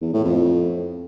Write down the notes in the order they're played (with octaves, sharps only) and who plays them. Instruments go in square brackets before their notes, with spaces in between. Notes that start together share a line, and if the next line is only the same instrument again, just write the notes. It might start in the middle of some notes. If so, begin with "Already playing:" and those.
[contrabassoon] E2
A2
F2